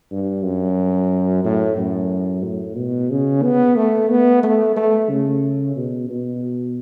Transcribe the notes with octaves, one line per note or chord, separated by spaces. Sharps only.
G2
F#2
A2
F#2
A2
B2
C#3
B3
A3
B3
A3
A3
C#3
B2
B2